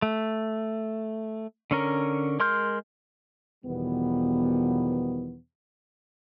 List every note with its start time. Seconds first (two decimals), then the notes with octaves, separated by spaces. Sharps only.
0.02 A3
1.71 D3 C#4 A#4
2.40 G#3 A#4 C6 F6 G6
3.65 E2 B2 D#3 F3 G3 B3